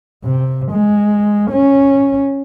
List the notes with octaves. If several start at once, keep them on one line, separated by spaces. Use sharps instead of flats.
C3
G#3
C#4